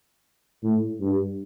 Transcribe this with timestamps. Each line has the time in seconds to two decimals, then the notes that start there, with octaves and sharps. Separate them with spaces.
0.63 A2
1.01 G2